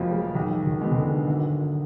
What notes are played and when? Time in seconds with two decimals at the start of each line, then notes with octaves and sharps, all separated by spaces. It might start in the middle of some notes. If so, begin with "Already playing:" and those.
Already playing: F1 F2 F3 F#3 G#3 A#3
0.12 G#3
0.34 B1 D#3
0.66 D#3
0.81 B2 G#3 B3
0.92 D#3
0.97 D3
1.27 G#1